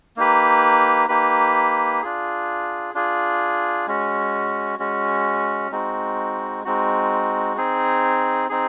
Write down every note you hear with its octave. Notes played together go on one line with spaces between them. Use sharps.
A#3 D#4 G4 B4
A#3 D#4 G4 B4
D4 F4 G#4
D4 F4 G#4
G#3 C#4 F#4
G#3 C#4 F#4
G#3 C4 D#4 F#4
G#3 C4 D#4 F#4
C4 D#4 G#4
C4 D#4 G#4